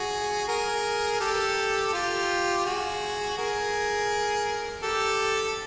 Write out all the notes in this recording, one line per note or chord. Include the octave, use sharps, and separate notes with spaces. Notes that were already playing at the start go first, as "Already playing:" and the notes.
Already playing: F#4 G#4
G#4 A#4
G4 A4
F4 G4
F#4 G#4
G#4 A#4
G4 A4